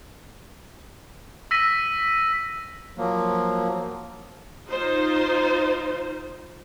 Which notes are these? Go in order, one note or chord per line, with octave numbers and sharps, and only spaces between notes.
E6 A#6 B6 D#7
F3 F#3 A#3
D#4 F4 C5